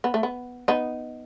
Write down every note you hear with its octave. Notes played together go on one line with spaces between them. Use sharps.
B3
A3
B3
B3 D#4